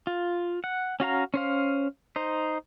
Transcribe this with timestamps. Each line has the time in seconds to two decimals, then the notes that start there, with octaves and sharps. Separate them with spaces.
0.07 F4
0.64 F#5
1.00 C#4 F#4 F5 A#5
1.34 C#4 C5 F5
2.16 D#4 C5